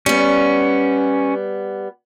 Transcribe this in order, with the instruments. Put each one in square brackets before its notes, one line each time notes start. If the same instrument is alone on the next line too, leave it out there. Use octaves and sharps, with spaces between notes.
[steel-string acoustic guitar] G3 B3 [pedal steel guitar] C#4